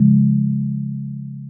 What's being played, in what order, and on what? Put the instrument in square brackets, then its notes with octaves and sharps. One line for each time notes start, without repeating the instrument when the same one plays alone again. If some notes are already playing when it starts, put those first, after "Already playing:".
Already playing: [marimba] C#3 F3 G#3